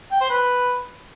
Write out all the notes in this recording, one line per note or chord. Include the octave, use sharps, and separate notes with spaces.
G5
C5
B4